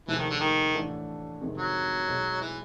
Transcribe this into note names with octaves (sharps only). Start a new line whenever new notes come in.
F1 D#2 C#3 E3 F3 A3
D#3
D3
D#3
A1 A2 E3 A3 D4
F2 C3 D#3 G#3
F#3
B1 B2 G#3
E3